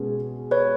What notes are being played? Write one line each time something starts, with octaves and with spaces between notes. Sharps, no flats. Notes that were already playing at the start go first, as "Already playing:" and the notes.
Already playing: B2 G#3 C#4 G#4
B4 C#5